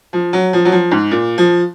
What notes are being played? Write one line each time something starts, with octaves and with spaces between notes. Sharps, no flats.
F3
F#3
F3
F#3
F3
G#2
A#2
F3